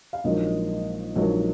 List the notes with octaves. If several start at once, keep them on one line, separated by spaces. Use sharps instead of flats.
F5
A#1 G#2 F#3 A#3 D#5
A#1 G#2 F#3 A#3